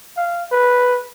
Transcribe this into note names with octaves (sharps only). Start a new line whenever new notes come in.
F5
B4